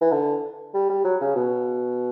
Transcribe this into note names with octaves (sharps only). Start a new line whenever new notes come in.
E3
D3
G3
G3
F#3
C#3
B2